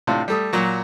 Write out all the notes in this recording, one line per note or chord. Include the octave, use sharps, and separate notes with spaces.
A2 C3 D4 F4
G3 A3 D#6
A#2 F#3 F#4